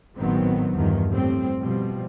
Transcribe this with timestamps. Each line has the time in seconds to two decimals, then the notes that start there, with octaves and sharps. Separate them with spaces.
0.17 G#1 A2 D#3 F#3 B3 C4
0.73 E2 G2 D#3 F3
1.09 A2 G3 C4
1.59 B2 F3 G3 C4